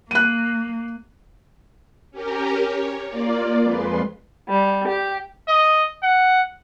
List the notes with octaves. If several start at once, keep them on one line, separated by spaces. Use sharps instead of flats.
A#3 F#6 D#7
C#4 G4 A#4
C#5
A#3 F4 D5
F2 G#3 B4 C6
G3
G4
D#5
F#5